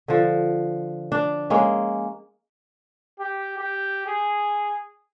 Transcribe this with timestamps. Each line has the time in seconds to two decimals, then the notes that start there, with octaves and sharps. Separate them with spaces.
0.08 D3 F3
1.12 D4
1.50 G#3 A#3 C#4
3.20 G4
3.58 G4
4.06 G#4